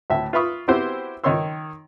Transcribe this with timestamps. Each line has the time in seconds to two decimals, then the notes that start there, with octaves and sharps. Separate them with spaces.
0.10 D2 A2 E5
0.33 F4 B4 E5 B5 C#6 D#6
0.68 B3 C4 E4 F#4 G4 C5
1.24 D#3 D#4 C#5 C6 E6